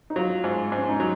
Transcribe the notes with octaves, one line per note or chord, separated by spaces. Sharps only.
D#4
F#3 F4
G#2
G#2
C#4
D#4
F#3